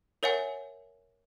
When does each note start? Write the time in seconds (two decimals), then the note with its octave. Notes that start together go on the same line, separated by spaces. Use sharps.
0.23 A#4 C#5 E5 F#5 G#5